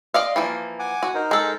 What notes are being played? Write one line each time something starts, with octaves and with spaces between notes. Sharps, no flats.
D5 D#5 F5 C6
E3 F3 A#3
F#5 G#5 D6
F#4
D#4 A#4 C5
G#3 A4